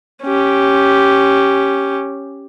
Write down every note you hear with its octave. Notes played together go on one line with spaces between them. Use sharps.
C#4 G4